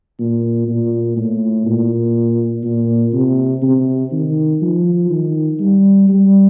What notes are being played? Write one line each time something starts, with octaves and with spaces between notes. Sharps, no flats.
A#2
A#2
A2
A#2
A#2
C3
C3
D#3
F3
D#3
G3
G3